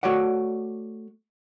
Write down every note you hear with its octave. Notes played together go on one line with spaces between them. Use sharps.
A3 F#4 C#5 D5 F#5